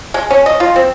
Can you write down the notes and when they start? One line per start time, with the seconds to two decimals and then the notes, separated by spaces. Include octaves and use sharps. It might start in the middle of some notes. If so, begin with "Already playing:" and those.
0.14 G#3
0.31 C#4
0.46 D#5
0.60 F4
0.76 C4